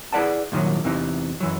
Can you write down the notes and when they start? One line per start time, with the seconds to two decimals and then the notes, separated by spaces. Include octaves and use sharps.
0.13 E4 G#4 B4 D5 F#5 A5
0.52 C2 A#2 D#3 E3 F#3
0.84 E2 C3 E3 D#4
1.40 F#2 E3 F#3